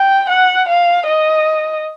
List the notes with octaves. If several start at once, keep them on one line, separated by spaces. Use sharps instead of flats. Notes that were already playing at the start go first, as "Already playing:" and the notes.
Already playing: G5
F#5
F5
D#5